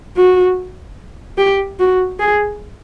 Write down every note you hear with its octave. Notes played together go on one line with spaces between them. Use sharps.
F#4
G4
F#4
G#4